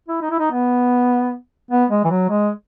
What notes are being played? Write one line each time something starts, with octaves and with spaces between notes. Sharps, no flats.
E4
D#4
E4
D#4
B3
B3
G#3
E3
F#3
G#3